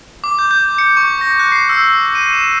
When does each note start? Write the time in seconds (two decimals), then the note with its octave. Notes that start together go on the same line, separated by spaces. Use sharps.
0.24 D6
0.39 G6
0.51 G6
0.78 C#7
0.97 C#6
1.21 A#6
1.40 F#6
1.52 C7
1.69 E6
2.15 D#7
2.33 E7